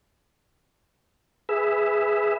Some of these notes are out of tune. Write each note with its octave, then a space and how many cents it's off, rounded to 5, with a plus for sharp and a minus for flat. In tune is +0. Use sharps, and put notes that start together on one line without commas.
G#4 +0 B4 +0 E5 +0